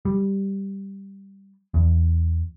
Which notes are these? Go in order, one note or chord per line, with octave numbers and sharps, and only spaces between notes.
G3
E2